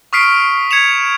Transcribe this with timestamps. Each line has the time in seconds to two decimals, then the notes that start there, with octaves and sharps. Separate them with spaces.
0.13 C#6 D#6 F6 B6 C7 D7
0.71 G#6 C#7 E7 F7